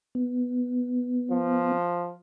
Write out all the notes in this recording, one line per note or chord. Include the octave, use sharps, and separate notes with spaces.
B3
F3